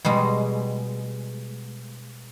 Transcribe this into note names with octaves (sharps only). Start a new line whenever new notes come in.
B2 G3 G#3